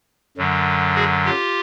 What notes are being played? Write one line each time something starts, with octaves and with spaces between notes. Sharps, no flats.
F#2 D3 F#3
F#4 G#4
F4 G4